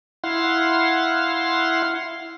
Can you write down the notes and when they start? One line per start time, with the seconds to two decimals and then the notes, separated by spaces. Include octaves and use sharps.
0.24 E4 F5 F#5 C6